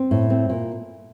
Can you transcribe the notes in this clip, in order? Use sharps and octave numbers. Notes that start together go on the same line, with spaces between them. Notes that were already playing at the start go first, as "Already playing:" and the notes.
Already playing: C4
A2
C4
A#2